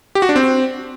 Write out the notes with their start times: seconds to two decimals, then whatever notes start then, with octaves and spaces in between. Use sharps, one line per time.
0.15 G4
0.22 F#4
0.29 D4
0.36 C4